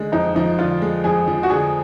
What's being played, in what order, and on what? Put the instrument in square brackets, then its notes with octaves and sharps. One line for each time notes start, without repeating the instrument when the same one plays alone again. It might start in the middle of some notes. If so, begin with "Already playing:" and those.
Already playing: [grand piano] D3 G#3
[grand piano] F2 [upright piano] D#4
[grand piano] F3 [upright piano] D#4
[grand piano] D3 [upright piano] F4
[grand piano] G#3
[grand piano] F2 [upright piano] G#4
[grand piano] F3
[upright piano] F#4
[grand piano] D3 [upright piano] G#4